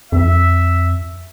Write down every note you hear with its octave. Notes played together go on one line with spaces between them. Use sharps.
F2 E5